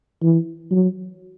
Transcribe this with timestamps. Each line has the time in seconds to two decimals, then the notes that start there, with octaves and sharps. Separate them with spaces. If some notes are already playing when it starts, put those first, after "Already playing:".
0.23 E3
0.72 F#3